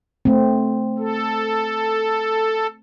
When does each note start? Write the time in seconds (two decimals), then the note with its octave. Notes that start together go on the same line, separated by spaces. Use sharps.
0.25 A3 C4
0.99 A4